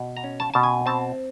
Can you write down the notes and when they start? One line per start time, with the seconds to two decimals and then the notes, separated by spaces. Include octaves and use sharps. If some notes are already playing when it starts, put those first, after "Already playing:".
Already playing: B2
0.17 A#5
0.24 C#4
0.40 A5
0.54 B2 A5
0.63 G#5
0.86 C4 A5